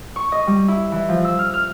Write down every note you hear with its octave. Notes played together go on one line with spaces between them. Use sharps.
C#6
D#5
G3
E4
E3
F3
E6
F6
F6